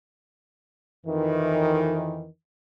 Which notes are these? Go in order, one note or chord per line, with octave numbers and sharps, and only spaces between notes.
F2 D#3 E3